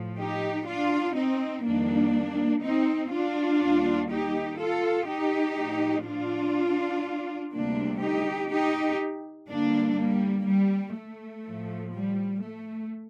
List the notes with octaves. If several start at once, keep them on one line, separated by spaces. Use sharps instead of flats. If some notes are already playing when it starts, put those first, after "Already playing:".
Already playing: A2 F3
D#4 G4
D4 F4
C4 D#4
F2 D#3 G3 A#3 D4
C4 D#4
D4 F4
D#2 D#3 G3
D#4 G4
F4 A4
D#4 G4
A2 F3
D4 F4
D2 C3 G3 A#3 D4
D#4 G4
D#4 G4
G2 D3 G3 A#3 D4
G3 A#3
G3
A3
A2 F3
G3
A3